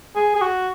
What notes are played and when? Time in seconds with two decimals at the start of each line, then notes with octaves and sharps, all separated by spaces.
0.16 G#4
0.36 G#4
0.42 F#4